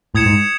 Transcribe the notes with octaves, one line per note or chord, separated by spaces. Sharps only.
A2 D#6 G#6 C#7 E7
G#2